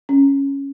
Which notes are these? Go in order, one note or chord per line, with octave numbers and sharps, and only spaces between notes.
C#4